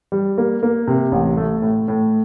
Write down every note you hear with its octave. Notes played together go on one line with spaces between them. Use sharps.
G3
A#3
A#3
C3
A1
A3
A2
A2